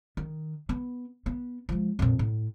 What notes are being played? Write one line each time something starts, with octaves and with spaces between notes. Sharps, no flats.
D#3
B3
B3
F3 G#3
F2 A#2
A2